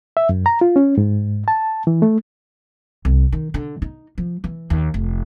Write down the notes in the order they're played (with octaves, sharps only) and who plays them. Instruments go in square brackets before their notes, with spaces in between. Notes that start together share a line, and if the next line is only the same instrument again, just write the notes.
[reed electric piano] E5
F#2
A#5
F4
C#4
G#2
A5
E3
A3
[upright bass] C2
D#3
D3
D#4
F3
E3
D#2
F1